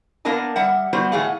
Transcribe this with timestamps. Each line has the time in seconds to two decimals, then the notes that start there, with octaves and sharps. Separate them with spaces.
0.25 A#3 B3 D4 A#4 D#5 A5
0.56 G3 E5 F#5
0.93 G3 B3 F#4 C5
1.12 A2 E3 A3 G#4 F5 F#5